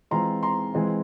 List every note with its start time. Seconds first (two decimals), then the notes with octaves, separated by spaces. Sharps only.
0.11 E3 G#3 C4 F4 A#5 C6
0.43 A#5 C6
0.73 E3 G#3 C4 F4